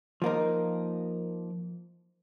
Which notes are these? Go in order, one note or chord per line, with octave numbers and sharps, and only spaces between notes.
F3 A#3 D#4 A#4